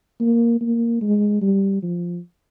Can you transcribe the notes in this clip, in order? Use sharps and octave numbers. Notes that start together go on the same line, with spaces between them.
A#3
A#3
G#3
G3
F3